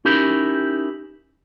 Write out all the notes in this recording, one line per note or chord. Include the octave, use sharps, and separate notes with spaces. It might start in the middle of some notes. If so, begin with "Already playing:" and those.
C#4 D#4 E4 G4 A#4